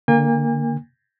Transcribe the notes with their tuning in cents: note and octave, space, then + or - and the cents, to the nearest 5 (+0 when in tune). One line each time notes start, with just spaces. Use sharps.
D3 +0 A#3 +0 G#5 -45